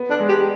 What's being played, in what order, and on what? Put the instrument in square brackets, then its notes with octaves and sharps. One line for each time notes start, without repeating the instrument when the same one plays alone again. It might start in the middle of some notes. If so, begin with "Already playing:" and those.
Already playing: [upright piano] B3
[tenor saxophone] D4
[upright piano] G#3
[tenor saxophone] G4